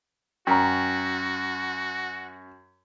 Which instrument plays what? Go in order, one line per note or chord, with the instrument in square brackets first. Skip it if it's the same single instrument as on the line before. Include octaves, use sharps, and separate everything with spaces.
[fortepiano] F#2 [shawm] F#4 [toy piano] G5 A#5